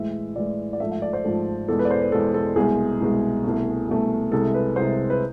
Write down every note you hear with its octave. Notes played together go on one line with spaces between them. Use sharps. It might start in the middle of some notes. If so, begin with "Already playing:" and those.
Already playing: A2 E3 G#3 E5
A2 E3 G#3 D5
D5
G#2 F3 A3 E5
E5
D5
C5
G#2 F3 A3 A4
E2 B2 G#3 A4
B4
D5
C5
B4
E2 B2 G#3 A4
A4
C2 B2 G#3 G#4
C2 B2 G#3
C2 B2 A3
C2 B2 A3
C2 C3 G#3 A4
B4
C2 C3 G#3 C5
B4